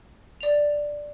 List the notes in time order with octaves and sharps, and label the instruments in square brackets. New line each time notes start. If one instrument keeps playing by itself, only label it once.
[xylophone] D5 F7